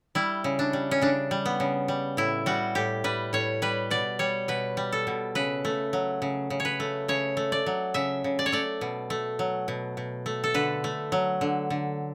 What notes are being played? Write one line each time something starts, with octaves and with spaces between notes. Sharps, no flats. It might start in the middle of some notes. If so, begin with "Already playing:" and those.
G3 E4
C#3
D4
G3
C#4
C#3 D4
G3
B3
C#3
G3
A2 E4
G3 F#4
A2 G4
G3 B4
A2 C#5
G3 B4
B2 D5
G3 C#5
B2 B4
G3
A4
B2
C#3 B4
A3
F#3
C#3
C#3
C#5
B4
A3
C#3 C#5
A3
D5
F#3
C#3 E5
C#3
D5
C#5
A3 D5
B2
A3
F#3
B2
B2
A3
A4
D3 B4
A3
F#3
D3
D3